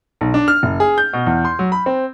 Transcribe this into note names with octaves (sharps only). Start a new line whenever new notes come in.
B1
D4
F6
F#1
G#4
G6
B2
E2
C6
F#3
B5
C4